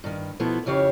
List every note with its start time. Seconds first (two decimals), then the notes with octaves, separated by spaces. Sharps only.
0.04 G2 D#3
0.39 B2 F3 B3 E4 A4
0.66 F2 C#3 E4 G4 C#5 F5